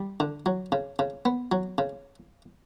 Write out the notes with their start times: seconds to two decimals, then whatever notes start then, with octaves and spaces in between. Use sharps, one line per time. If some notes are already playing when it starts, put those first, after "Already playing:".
Already playing: G3
0.20 D3
0.46 F#3
0.72 C#3
0.99 C#3
1.25 B3
1.52 F#3
1.78 C#3